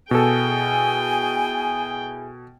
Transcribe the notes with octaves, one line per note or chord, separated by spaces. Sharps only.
B2 E4 G#4 A4 G5 G#5